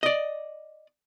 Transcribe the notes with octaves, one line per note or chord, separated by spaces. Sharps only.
D5 D#5